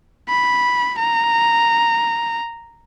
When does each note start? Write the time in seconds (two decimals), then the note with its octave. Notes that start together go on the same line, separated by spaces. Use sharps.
0.29 B5
0.99 A#5